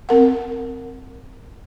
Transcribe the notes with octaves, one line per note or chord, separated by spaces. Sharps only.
C4 A#4 F#5